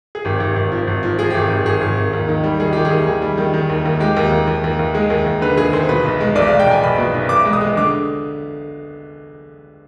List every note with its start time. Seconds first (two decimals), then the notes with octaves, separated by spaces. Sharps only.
0.15 G#4
0.25 G#1 G4
0.40 G#1
0.56 G#1
0.72 F3
0.87 G#1
1.03 F3
1.18 F3 G#4
1.30 G#1 G4
1.42 G#4
1.50 G#1
1.66 G#1 G#4
1.81 G#1
1.97 G#1
2.13 D#2
2.29 D#3
2.44 G3
2.60 D#3 G#4
2.73 D#3 G4
2.85 G#4
2.91 D#2
3.06 D#3 G#4
3.22 G3
3.38 D#3
3.54 D#3
3.70 D#2
3.85 D#2
4.00 G#3 G4
4.17 D#2
4.32 D#2
4.47 D#2
4.64 D#2
4.79 D#2
4.94 G#3 G#4
5.10 D#2
5.26 D#2
5.42 D3 B4
5.57 D#2 G#4
5.73 D#2 C5
5.89 B2 B4
6.04 B1
6.21 G#3
6.35 B1 D5
6.47 F5
6.52 G#3
6.60 G5
6.67 B1 G#5
6.83 B1 B5
6.98 B2
7.14 B1
7.29 B1 D6
7.45 G#3
7.53 D#6
7.61 G#3
7.77 D3 D6